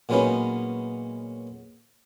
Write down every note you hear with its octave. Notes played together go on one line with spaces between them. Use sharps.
A#2 F#3 G#3 B3 C#4 D#4